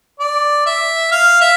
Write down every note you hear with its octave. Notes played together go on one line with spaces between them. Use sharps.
D5
E5
F5
E5